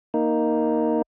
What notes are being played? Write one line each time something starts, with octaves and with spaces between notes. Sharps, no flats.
A#3 D#4